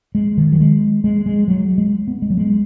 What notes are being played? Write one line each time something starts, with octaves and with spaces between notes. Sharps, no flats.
G#3
D#3
F#3
G#3
G#3
G#3
F#3
G#3
B3
G#3
F#3
G#3